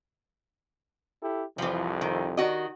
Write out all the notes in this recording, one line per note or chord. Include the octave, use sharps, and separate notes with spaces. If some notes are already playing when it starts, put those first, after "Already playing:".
E4 G4 A4
C2 F2 E3 F3
D#3
D#3 F#4 D#5